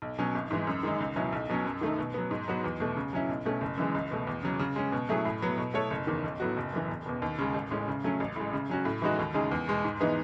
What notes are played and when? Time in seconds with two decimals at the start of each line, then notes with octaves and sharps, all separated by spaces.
0.02 B1
0.18 B2 F#3 C#4
0.35 G#1
0.51 G#2 E3 G#3
0.67 F#2
0.83 D#3 G#3 D#4
1.00 C#2
1.16 B2 F#3 C#4 E4
1.32 B1
1.49 B2 F#3 C#4
1.65 F#2
1.81 D#3 A3 D#4
1.98 B2
2.14 F#3 B3
2.31 G#2
2.48 F#3 B3 F#4 B4
2.64 E2
2.80 B2 A3
2.96 C#3
3.13 F#3 C#4 E4
3.29 B1
3.45 B2 A3 C#4
3.61 F#1
3.77 F#2 E3 G#3
3.95 C#2
4.11 B2 A3
4.27 E2
4.43 C#3 F#3
4.59 C#3
4.76 G#3 C#4
4.92 B2
5.09 F#3 A3 E4 G#4
5.25 A2
5.42 F#3 B3
5.58 B2
5.74 A3 E4 A4 C#5
5.91 F#1
6.07 E2 D#3
6.24 B1
6.40 A2 F#3 B3 F#4
6.57 F#1
6.73 F#2 E3
6.89 E1
7.06 E2 B2
7.22 D#2
7.38 C#3 G#3
7.54 A1
7.71 A2 G#3 C#4
7.88 C#3
8.04 F#3 A3 C#4
8.20 A1
8.36 A2 G#3
8.53 C#3
8.69 F#3 C#4 F#4
8.85 A2
9.02 E3 G#3 D#4 F#4
9.19 D#2
9.34 C#3 G#3 D#4 G#4
9.51 E2
9.68 B2 G#3
9.84 G#2
10.00 E3 B3 D#4 G#4